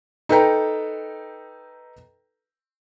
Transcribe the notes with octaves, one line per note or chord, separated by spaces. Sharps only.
D#4 A4 B4 G5 A#5